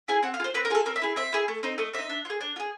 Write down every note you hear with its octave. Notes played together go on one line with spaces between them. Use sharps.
E4 G#4 G#5
C4 F#5
F5
F4 G#4 C5
C4 B4
A#4
F4 G#4 A4
C4 A#4
E5
E4 G#4
C4 E5
E4 G#4
A3
C4 D#4
A3 D#5
C4 D#4 E5
D4
F4
G#4
D4
F4
G#4